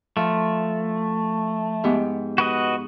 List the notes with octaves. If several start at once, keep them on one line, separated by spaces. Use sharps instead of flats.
F3 A3
G#2 B3 G4
F#4 B4 D#5